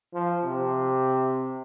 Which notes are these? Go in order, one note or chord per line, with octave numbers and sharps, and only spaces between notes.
F3
C3